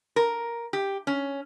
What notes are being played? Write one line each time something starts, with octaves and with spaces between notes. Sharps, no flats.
A#4
G4
C#4